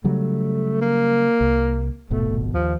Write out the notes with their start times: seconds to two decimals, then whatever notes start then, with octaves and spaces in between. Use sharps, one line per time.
0.04 C#3 F#3 G3 A3
0.81 A#3
1.41 C2
2.10 D#1 G#1 B2 A3
2.54 D#2 F3